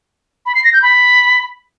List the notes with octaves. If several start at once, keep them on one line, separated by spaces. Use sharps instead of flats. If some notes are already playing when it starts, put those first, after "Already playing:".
B5
C7
A#6
G6
B5